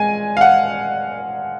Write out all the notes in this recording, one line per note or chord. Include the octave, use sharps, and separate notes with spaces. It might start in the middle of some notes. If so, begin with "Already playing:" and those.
Already playing: G#3 G#5
F5
F#5